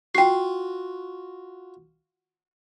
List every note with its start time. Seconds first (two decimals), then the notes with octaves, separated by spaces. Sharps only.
0.15 F4 F#4 G5 C7